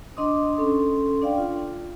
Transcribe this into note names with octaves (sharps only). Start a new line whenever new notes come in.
D4 D#5 C6 D6 D#6
C#4 A4 C6
D4 D5 F5 G5
F4